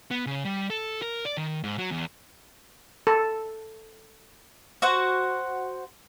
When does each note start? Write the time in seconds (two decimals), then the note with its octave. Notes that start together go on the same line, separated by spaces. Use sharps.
0.11 B3
0.26 C#3
0.45 G3
0.70 A4
1.02 A#4
1.25 D5
1.37 D#3
1.64 G#2
1.78 F#3
1.91 E2
3.07 A4
4.82 F#4 C5 F#5